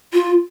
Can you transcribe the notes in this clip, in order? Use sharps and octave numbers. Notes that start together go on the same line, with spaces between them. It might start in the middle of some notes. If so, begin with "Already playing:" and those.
F4